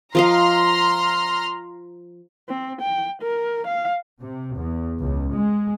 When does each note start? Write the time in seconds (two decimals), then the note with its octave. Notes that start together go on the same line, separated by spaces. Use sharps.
0.15 F3 D#5 F5 A#5 C6 F6
2.49 C4
2.81 G5
3.21 A#4
3.67 F5
4.21 C3
4.57 E2
5.02 C#2
5.34 G#3